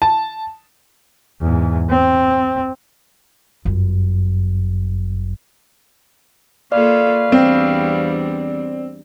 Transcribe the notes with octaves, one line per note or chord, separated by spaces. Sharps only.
A5
E2 G#2
C4
G1 F#2
A#3 F4 A4 B4 C#5 D5 F5
E2 G3 C4 D4